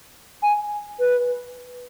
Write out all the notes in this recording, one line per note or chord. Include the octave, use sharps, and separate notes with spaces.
G#5
B4